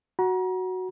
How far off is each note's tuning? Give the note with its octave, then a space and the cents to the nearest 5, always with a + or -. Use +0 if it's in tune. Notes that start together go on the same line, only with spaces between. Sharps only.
F#4 +0 A#5 +35